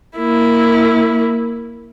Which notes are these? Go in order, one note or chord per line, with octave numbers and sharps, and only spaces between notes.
A#3 E4